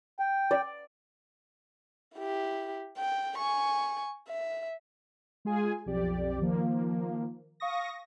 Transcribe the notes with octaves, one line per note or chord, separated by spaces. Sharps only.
G5
D5
E4 G4
G5
G#5 C#6
E5
G#3 F4 G#4 G#5
B1 F2 G4 D5
D#3 F3 A#3
F5 C#6 D#6 A#6